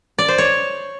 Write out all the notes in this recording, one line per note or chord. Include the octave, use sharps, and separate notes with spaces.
D5
C5
C#5